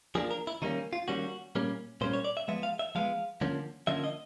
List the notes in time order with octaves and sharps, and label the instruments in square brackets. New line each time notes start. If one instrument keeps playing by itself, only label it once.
[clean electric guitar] F3 A#3 D4 G#4
A#4
E4
D#3 G3 A#3 C#4 D#4
F4
D#3 G3 A#3 C#4 F#4
A#2 G3 A#3 C#4
A#2 G3 A#3 C#4 C5
C#5
D5
E5
F3 G#3 B3 E5
F5
E5
F3 G#3 B3 F5
D3 F3 A#3 C#4
D3 F3 A#3 C#4 E5
D#5